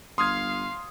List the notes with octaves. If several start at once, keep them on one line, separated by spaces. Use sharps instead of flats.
G1 F5 C6 D#6 F6 G#6